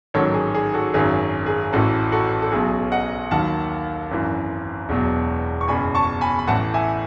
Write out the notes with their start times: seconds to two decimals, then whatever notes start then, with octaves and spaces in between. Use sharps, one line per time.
0.14 A1 G#2 D#3 F#3 A4 C#5
0.34 G#4
0.54 G#4
0.74 F#4 A4
0.94 G#1 F#2 D#3 F#3 G#4
1.46 G#4
1.73 A1 A2 E3 F#4 A4
2.12 F#4 A4
2.42 A4
2.52 B1 B2 F#3 G#4
2.92 D#5 F#5
3.31 D#2 D#3 F#3 F#5 A5
4.11 G#1 F#2 E3
4.89 E1 E2 B2 F#3
5.61 C#6
5.68 F#1 E2 B2 G#5 B5
5.95 A5 C#6
6.21 G#5 B5
6.39 B5
6.47 A1 A2 E3 F#5 A5
6.74 E5 G#5